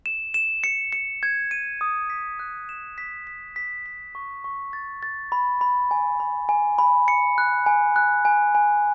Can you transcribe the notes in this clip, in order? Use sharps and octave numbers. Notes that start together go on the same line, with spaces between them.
E7
E7
C#7
C#7
G#6
D#7
D#6
B6
F#6
E7
B6
B6
B6
B6
C#6
C#6
A6
A6
B5
B5
G#5
B5
G#5
B5
C#7
F#6
G#5
F#6
G#5
G#5